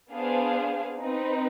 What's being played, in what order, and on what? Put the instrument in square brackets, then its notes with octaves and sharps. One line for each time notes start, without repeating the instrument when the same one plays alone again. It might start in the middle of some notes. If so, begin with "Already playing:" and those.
[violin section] B3 D4 G#4 C5 F5
C4 D#4 B4